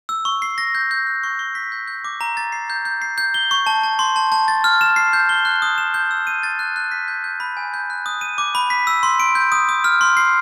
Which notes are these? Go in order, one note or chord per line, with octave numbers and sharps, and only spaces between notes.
E6
C#6
C7
A#6
G6
G6
F#6
C#6
C#6
B6
G6
G6
D6
A#5
A6
C7
G6
G6
C7
G6
G7
C#6
A5
A5
C6
A5
A5
A6
F6
E7
C7
G6
G7
F#6
D#6
E7
G6
E6
D#7
A6
F#6
F#6
B6
G6
G6
B5
G#5
G6
F#6
D#6
D#7
D6
B5
B6
E6
C6
D7
G6
D#6
D#6
F6
C6
C7